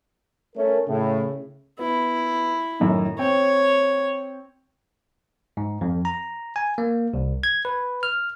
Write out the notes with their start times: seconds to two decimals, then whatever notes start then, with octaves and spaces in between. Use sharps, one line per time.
0.56 A3 C#4 A#4
0.88 A2 C#3
1.79 B3 E4
2.80 F#2 A2 D#3
3.19 C4 C#5 G5
5.57 G#2
5.81 F2
6.05 A#5
6.56 G#5
6.78 A#3
7.14 C2
7.43 G#6
7.65 B4
8.03 F6